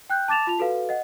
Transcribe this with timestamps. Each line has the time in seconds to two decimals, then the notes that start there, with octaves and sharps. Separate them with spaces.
0.10 G5 F#6 G6
0.28 A5 D6 A6 E7 F7
0.47 F4 A5 F7
0.59 F#4 A4 B4 F5
0.89 D#5 F#5